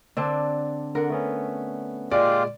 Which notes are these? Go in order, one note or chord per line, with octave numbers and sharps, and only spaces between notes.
D3 C4 D4
D3 A#4 F#5
A3 B3 C#4
A#2 G#3 F4 G4 D5